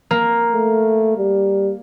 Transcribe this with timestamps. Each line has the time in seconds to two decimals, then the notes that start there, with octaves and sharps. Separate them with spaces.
0.11 A#3
0.52 A3
1.17 G3